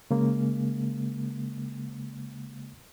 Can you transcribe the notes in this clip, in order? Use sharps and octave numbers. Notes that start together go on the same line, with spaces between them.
C#3 G#3 A#3